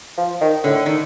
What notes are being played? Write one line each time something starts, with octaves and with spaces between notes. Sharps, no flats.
F3
D#3
A2 D3
D#3